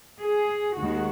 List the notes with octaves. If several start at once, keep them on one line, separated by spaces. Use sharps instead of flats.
G#4
D#2 D#3 G#3 F#4